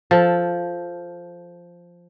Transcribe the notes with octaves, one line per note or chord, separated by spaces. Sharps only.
F3 A4